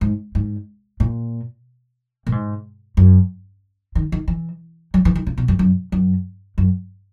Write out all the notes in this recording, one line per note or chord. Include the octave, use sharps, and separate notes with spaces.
G#2
G#2
A#2
A#2
G#2
F#2
D#3
D#3
E3
F#3
E3
D#3
C#3
B2
F#2
F#2
F#2
F#2